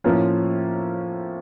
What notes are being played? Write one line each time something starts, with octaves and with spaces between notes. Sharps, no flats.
A2 F3 A#3 C#4 F4